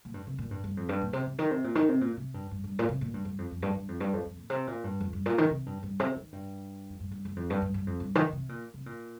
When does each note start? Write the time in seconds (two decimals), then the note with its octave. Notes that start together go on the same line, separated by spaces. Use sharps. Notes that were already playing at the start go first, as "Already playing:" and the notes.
0.05 A#2
0.14 G2
0.27 C3
0.39 A#2
0.51 G2
0.64 G2
0.77 F2
0.89 G2
1.01 A#2
1.13 C3
1.26 C3
1.38 D#3
1.51 C3
1.64 A#2
1.75 D#3
1.89 C3
2.01 A#2
2.17 C3
2.34 G2
2.51 G2
2.64 G2
2.79 A#2
2.89 C3
3.01 A#2
3.14 G2
3.25 G2
3.38 F2
3.51 F2
3.62 G2
3.75 G2
3.88 F2
4.00 G2
4.13 F2
4.26 F2
4.37 A#2
4.50 C3
4.67 A#2
4.84 G2
5.00 F2
5.13 G2
5.26 A#2
5.38 D#3
5.50 C3
5.66 G2
5.83 G2
6.00 C3
6.16 D#3
6.33 G2
6.89 F2
7.00 G2
7.11 G2
7.25 G2
7.36 F2
7.50 G2
7.62 G2
7.74 G2
7.87 F2
8.00 G2
8.15 D#3
8.28 D#3
8.33 C3
8.49 A#2
8.74 C3
8.86 A#2